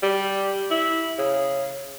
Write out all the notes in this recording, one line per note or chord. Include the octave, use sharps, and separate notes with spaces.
G3
E4
C#3